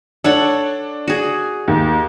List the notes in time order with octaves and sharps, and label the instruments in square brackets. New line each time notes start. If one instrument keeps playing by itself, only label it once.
[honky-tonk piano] D4 [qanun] A4 C#5 F#5
[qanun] F#4 G#4
[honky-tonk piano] D#2